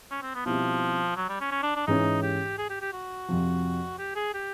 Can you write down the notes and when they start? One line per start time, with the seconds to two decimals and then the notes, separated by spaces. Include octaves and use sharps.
0.11 C#4
0.22 C4
0.35 B3
0.46 B2 F3 G3 C4 E4
1.17 F#3
1.29 G3
1.41 C#4
1.51 C#4
1.63 D4
1.76 D4
1.87 G#2 E3 G#3 C#4 D#4 E4
2.23 G4
2.58 G#4
2.70 G4
2.81 G4
2.93 F#4
3.29 F2 C3 F3
3.99 G4
4.15 G#4
4.34 G4